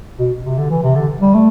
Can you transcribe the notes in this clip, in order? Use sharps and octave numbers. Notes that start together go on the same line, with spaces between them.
B2
C3
D3
E3
C3
D3
G3
A3